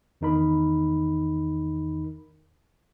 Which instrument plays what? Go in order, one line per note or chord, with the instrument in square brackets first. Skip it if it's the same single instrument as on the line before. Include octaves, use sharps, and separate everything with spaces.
[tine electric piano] E2 D#3 D#4 A#4 B5